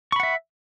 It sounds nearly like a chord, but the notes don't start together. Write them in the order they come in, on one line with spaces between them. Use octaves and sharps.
C#6 B5 F#5 E5